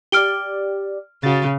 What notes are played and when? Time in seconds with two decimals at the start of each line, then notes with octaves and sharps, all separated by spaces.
0.12 G4 D5 F6 D7 G7
1.23 C#3 F#4 A6